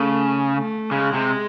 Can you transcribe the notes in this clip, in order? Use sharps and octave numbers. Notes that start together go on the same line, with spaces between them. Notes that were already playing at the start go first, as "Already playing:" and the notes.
Already playing: C#3 A3
A3
C#3 G#3
C3